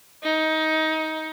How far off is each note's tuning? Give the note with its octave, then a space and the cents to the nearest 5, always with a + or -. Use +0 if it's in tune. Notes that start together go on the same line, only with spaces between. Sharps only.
D#4 +20